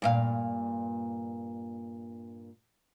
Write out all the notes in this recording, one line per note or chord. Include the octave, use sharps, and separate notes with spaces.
G2 A#2 F5